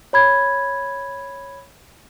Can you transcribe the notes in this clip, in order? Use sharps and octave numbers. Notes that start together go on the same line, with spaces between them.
C#5 B5 G#6